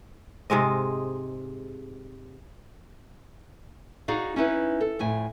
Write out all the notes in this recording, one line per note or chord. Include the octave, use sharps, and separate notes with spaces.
G#2 C3 G#3 D#5
D#4 F#4 G#4 D5 F5
C#4 D#4 E4 B4
A4
F2 A2 G#5